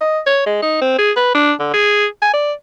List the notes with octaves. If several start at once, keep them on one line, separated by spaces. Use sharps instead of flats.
D#5
C#5
G#3
D#4
C4
G#4
B4
D4
D3
G#4
G#5
D5